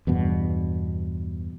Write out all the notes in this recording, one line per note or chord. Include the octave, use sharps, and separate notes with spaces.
E2 G2 B2